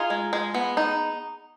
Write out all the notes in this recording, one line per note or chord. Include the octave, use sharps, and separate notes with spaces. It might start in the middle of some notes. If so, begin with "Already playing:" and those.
Already playing: D#4 F4 G#4
G#3
G#3
B3
D#4